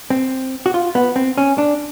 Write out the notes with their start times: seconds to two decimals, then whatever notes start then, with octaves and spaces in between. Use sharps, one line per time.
0.10 C4
0.66 F#4
0.74 F4
0.95 B3
1.16 C4
1.38 C#4
1.58 D4